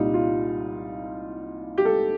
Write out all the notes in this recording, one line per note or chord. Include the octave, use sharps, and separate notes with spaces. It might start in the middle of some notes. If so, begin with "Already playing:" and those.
Already playing: C2 A#2 G3 D#4
F4
G4
A4